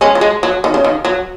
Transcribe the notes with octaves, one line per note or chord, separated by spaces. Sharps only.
G#3 C#4
F#3
G#3
F#3
D#3
C#3
D#3
F#3